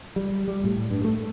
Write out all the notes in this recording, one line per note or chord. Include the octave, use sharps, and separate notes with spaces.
G3
G3
A2
G2
A3